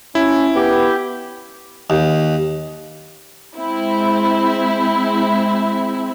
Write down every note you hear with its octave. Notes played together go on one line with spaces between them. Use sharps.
C#4 E4
B3 G4
D#2
G#3 C4 E4